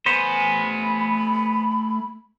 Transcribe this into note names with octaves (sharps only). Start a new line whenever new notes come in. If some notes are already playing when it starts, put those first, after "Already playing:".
A3 B3 C5 G#5 B5